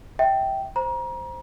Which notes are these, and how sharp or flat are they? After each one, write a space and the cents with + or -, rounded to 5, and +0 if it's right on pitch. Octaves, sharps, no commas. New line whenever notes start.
E5 -20 G5 -10
C5 +0 A#5 +30